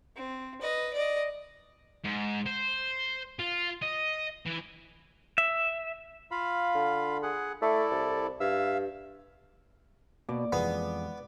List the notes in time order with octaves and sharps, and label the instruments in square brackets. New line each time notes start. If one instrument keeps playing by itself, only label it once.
[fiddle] C4
B4 D#5
D5 D#5
[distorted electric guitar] G#2
C5
F4
D#5
E3
[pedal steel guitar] E5
[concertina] F4 F5 B5
[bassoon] D3
[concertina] G#4 F#5
[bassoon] A3 [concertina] E4 A4 D5
[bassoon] C2
[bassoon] G2 [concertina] E5 F5 E6
[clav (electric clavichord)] B2 [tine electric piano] A#3 [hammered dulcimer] D5
[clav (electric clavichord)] F2 G#4 [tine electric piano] E3 G#3 [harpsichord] B3